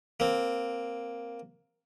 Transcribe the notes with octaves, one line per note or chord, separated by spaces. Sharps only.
A#3 C4